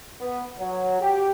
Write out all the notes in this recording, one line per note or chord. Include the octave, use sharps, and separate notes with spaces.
B3
F#3
G4